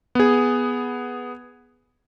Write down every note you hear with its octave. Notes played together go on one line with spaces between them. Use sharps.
B3 G#4